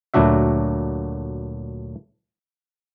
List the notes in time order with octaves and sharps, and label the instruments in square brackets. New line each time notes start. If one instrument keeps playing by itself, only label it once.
[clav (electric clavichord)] D2 A#2 F#3 D4 F#4 E5